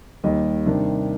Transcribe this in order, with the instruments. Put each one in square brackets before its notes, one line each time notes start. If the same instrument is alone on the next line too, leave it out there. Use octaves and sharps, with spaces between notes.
[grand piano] D#2 D#3 G3 D#5
C3 D#3 G3 D4